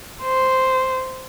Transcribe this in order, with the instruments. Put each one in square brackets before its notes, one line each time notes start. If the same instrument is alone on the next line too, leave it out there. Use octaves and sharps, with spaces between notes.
[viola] C5